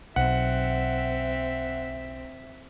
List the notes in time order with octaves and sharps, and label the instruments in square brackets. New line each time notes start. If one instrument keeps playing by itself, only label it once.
[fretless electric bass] B1 [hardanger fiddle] C4 [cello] E5 [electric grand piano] F#5